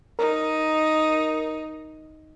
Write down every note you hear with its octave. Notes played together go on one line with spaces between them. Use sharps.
D#4 A#4